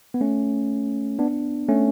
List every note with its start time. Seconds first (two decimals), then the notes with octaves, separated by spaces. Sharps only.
0.14 B3
0.21 A3 C#4
1.19 B3 D4
1.69 A3 C#4